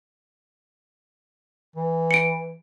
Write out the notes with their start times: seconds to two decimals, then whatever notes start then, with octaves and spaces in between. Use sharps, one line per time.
1.76 E3
2.11 C#7 D7